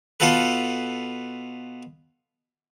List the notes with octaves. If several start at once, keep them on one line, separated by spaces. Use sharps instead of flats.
B2 F4 A4 B4